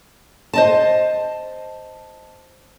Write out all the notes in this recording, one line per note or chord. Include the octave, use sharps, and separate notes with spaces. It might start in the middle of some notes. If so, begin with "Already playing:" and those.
C5 D#5 A5